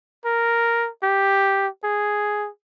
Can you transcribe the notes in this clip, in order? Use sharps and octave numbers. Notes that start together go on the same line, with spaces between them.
A#4
G4
G#4